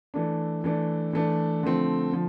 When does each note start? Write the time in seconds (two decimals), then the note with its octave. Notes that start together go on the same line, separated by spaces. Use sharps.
0.14 E3 A3 D4
0.64 E3 A3 D4
1.13 E3 A3 D4
1.63 D3 F3 A3 C4
2.12 D3 F3